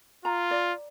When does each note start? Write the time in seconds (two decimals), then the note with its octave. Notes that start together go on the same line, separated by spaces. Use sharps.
0.25 F4 A#5
0.51 D5